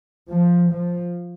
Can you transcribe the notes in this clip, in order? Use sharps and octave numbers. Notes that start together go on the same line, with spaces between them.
F3
F3